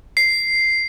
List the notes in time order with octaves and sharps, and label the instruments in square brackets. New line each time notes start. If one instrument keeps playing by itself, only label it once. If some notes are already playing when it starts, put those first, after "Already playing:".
[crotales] C7